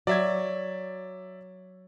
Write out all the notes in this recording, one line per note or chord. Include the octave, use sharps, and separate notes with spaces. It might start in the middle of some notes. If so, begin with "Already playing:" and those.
F#3 D5 E5 G#6